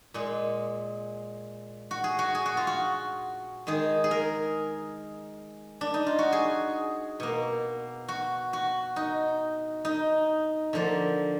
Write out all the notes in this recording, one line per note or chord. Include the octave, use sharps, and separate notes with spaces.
A#2 G#3
F#4
G#4
F#4
G#4
F#4
F4
F#4
D#3 G#3 G#4
G#4
A#4
D4
D#4
F4
F#4
G#4
B2 A#3
F#4
F#4
D#4
D#4
D3 F3 A#3